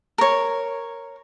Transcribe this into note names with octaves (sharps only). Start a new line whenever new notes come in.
A#4 C#5